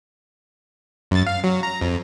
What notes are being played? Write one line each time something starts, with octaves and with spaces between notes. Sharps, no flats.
F#2 A6
F5
F#3
A#5
F2